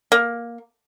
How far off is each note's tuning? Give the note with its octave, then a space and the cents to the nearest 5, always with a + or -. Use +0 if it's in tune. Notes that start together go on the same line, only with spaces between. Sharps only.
A#3 +10